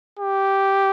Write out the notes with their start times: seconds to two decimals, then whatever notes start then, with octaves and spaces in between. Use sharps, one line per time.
0.19 G4